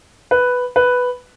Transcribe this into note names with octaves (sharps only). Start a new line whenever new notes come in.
B4
B4